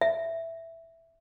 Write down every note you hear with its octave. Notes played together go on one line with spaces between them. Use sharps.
E5